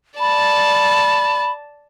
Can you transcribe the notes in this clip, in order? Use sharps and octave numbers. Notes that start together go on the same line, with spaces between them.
D5 A5 B5